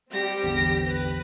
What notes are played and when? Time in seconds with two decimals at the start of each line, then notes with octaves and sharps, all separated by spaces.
0.11 G3 C4 G4 A#6
0.43 A1 E2 D3
0.86 B4